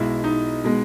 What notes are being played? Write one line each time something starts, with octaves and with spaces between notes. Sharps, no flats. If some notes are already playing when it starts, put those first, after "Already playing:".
Already playing: B1 B2 G#3 E4
D#4
B2 G#3